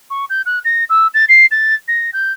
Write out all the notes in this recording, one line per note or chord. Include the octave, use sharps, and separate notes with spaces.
C#6
G6
F#6
A#6
E6
A6
C7
A6
A#6
G6